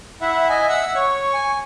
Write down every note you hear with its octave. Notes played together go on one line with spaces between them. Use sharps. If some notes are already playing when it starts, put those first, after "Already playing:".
E4 E5 F#5
D#5 G#5
F#5 E6
C#5 C#6
G#5